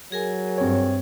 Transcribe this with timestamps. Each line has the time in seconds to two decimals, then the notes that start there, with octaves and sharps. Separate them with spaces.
0.12 F#3 G#4 A#4 G#5
0.58 G2 C4 C#5